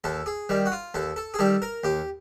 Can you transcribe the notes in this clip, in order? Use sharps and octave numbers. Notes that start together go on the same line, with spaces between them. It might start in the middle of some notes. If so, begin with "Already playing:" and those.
D#2 A4
G#4
D#3 G3
F#4
F4
D#2 A4
A4
G#4
D#3 G3 A4
A#4
D#2 G4